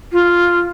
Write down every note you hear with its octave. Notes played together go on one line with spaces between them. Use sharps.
F4